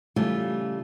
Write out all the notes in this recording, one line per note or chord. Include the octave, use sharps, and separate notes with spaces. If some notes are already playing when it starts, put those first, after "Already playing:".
C#3 E3 G3 A3 F4